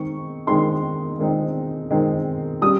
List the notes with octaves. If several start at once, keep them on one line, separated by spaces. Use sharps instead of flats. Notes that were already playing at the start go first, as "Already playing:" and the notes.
Already playing: D#3 G#3 C4 D#4 C#6
D#3 G#3 C4 D#4 C6
D#3 G#3 C4 D#4
D#3 G#3 C4 D#4
G3 C#4 D#6